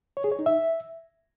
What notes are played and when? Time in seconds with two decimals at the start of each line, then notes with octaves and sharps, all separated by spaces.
0.17 C#5
0.24 G#4
0.31 C#5
0.39 D#4
0.46 E5